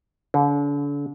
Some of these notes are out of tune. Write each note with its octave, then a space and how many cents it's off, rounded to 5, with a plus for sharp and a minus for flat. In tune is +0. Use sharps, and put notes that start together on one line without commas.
D3 -40